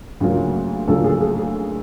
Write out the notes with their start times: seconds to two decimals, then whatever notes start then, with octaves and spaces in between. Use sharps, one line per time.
0.20 D2 C#3 F#3 A#3
0.88 D2 C#3 F#3 A#3 A4
1.04 G#4
1.21 G#4